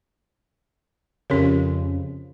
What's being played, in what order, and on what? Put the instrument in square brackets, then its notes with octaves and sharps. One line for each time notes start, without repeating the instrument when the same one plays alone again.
[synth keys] F2 C#3 [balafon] C#4 G4 A#4